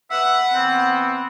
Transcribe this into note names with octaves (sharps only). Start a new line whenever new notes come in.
B4 E5 F#5
E3 B3 C4